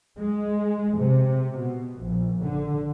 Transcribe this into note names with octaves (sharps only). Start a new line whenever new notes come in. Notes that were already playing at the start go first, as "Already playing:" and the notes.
G#3
C3
B2
A#1
D3